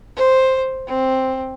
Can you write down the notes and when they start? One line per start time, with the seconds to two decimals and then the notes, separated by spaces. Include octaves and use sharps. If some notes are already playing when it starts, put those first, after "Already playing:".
0.16 C5
0.87 C4